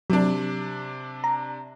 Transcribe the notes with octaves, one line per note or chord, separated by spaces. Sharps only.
C3 F#3 D4
A#5